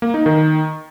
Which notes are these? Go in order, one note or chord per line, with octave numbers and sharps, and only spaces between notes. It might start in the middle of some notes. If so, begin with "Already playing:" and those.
A#3
D#4
D#3